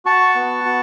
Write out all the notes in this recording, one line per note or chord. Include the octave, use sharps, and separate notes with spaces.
F#4 A5 C#6
B3
F#4